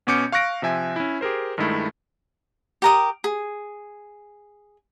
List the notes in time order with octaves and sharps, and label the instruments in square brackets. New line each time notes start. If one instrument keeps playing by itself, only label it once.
[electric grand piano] B2 B3 C#4 D6 G6 C#7
F5 C#6 F#6 A#6 D7
C3 F3 E5 G#5
C#4 E4
G4 G#4 A#4 C5
G2 D#3 G#3 A3 E4
[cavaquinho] G4 A#4 D#6
G#4